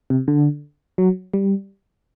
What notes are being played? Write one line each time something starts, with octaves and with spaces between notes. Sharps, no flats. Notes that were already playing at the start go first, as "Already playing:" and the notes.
C3
D3
F#3
G3